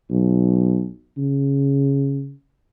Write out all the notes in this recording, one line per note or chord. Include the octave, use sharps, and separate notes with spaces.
B1
C#3